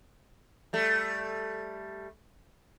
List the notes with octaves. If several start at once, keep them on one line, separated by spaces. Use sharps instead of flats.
G3 A3